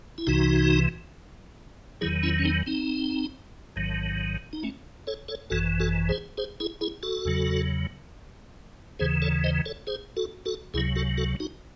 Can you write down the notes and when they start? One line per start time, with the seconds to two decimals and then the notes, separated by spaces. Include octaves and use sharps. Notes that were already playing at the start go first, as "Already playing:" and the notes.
0.18 E4
0.27 C2 C3 E3 D#4 F#4
2.01 E2 D#3 F#3 E4 G#4
2.23 C#4 E4
2.39 C#4
2.44 C4 D#4
2.67 C4 D#4
3.76 A1 G#2 D#3 F#3
4.53 D#4
4.63 A3 C#4
5.07 A4 C#5
5.28 A4 C#5
5.50 G#1 F#2 E3 F#4 A4
5.80 F#4 A4
6.09 G#4 C5
6.38 G#4 C5
6.60 E4 G#4
6.81 E4 G#4
7.03 F#4 A4
7.25 E2 C#3 F#3
8.99 D#2 C#3 E3 G#4 C5
9.22 A4 C#5
9.44 C5 D#5
9.66 A4 C#5
9.87 G#4 C5
10.17 F#4 A4
10.45 F#4 A4
10.74 C#2 C3 F#3 E4 G#4
10.96 F#4 A4
11.18 F#4 A4
11.40 D#4 F#4